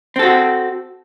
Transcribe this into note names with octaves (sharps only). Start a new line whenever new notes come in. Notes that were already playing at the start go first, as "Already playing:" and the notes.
C4 F#4 A4